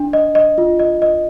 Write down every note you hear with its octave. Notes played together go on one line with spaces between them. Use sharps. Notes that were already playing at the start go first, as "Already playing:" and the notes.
Already playing: D4
D#5
D#5
F4
D#5
D#5